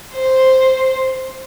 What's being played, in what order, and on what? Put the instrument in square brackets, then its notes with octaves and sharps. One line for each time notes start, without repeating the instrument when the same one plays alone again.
[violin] C5